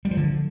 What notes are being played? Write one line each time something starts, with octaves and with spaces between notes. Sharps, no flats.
G3
F3
D3